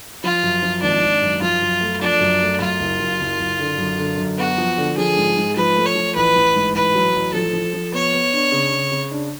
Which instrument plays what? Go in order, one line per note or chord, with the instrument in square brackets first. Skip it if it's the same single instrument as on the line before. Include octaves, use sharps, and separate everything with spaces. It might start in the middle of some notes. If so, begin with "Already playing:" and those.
[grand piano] F3 [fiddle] F4
[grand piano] F#2
F3
[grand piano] G#1 [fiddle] D4
[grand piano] G#1
F#2
[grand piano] F3 [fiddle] F4
[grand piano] F#2
A3
[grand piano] F3 [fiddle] D4
[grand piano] F#2
A3
[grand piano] F#2 [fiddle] F4
[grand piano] F#1
F#2
F#1
F#1
D3
F#2
D3
F#2
[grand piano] B3 [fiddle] F#4
[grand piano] F3
D3
[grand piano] F3 [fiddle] G#4
[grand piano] G#2
G#2
[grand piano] F3 [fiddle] B4
[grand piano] A3
[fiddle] C#5
[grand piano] F3
[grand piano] A1 [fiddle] B4
[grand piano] A1
G#2
[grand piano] A1 [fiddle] B4
[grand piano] F#3
A1
[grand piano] F3 [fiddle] A4
[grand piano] F3
F3
[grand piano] B3 [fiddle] C#5
[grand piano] B3
D4
C#3
C#3
C#3
D4